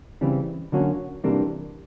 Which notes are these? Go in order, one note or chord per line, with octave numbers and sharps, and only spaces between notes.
C#3 E3 G3 C4
D3 F#3 A#3 C#4 F#4
C3 E3 G3 A#3 D4